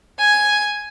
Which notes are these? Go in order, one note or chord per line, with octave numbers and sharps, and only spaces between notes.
G#5